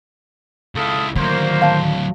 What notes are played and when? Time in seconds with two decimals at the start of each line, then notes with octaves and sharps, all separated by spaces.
0.75 C#2 E4 A4 F5 D#6
1.16 D2 D#3 F#3 A#3 C5
1.62 F5 A5